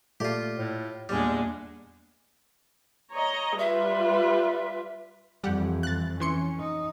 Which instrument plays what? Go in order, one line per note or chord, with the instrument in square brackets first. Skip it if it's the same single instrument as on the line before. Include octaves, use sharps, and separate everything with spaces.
[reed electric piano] A#2 A3 D5 [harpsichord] F4 G4
[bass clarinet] A2
[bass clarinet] E2 [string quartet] A#2 G#3 D4 [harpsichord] G3 [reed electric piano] F6
[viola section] C#5 D#5 A#5
[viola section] G3 F4 B4 [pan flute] E5
[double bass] F2 E3 [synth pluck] G3 G4 F#5
[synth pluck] F#6 A6
[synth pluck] E3 C6 C#7 [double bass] C#4
[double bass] D#4